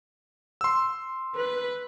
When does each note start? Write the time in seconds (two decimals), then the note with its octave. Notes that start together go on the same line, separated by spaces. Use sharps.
0.61 C6 E6
1.36 B4